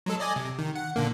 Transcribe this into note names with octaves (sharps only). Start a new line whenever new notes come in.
F#3 G#3 A4
D5 D#5 G#5
C3
D#3
F#5
A#2 D3 A#3